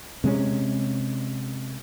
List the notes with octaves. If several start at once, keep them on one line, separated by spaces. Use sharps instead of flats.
C3 G#3 A3 C#4